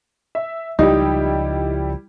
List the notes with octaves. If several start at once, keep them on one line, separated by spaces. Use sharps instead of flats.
E5
C#2 F3 G3 D#4 E4 G4